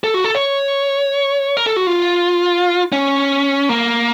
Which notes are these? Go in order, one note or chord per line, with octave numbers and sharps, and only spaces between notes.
A4
F#4
A4
C#5
A#4
A4
F#4
F4
C#4
A#3